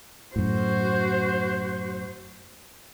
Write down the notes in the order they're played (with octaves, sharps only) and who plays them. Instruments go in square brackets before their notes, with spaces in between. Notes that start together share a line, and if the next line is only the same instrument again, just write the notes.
[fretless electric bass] F#2 A2 [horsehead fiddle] F#4 C5